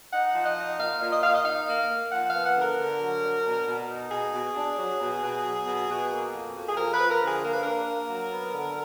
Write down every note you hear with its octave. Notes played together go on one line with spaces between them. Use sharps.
D#4 F#5
F3
D#5
D#4
A#2 F5
A#2
D#5
A#2 F5
D#5
D#4 F5
A#3
A#3
F3 F#5
F5
B3
F#5
D3
A#4
D3
F#3
D4
B2
B2
D#4
B2 G#4
B2
D4
F#3
B2
B2
F#3
B2
B2
A#3
F2
F2
G#4
F3 A#4
B4
F3
A#4
D3
G#4
A#3 A#4
B4
D4 A#4
A#3
F#3
B3
D3